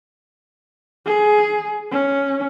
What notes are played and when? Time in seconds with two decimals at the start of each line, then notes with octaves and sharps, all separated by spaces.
1.06 G#4
1.91 C#4